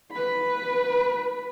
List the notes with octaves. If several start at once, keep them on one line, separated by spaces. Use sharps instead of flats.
B4 B5